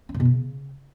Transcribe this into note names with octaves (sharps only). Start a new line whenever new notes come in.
C#4
A#2
B2
C#3